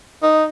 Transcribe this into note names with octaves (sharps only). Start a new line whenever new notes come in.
D#4